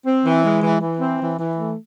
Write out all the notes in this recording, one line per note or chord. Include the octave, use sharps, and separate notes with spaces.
C4
E3
G#3
E3
E3
C4
E3
E3
A3